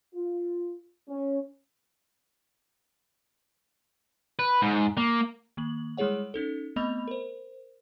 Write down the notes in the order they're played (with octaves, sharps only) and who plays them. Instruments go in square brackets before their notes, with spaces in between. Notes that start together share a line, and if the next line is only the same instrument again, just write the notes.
[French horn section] F4
C#4
[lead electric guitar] B4
G#2
A#3
[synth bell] D#3 A#3 F#7
G3 G#3 E4 G#4 C#5 F#5
C#4 D#4 A4
A3 B3 C4 D#5 B5 F7
A#4 C5